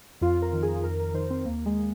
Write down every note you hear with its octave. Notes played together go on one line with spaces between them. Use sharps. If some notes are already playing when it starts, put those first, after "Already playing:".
F2 F4
A#4
D#3
G#4
F2 A#4
A#4
D#3 C5
C4
D#2 A#3
G#3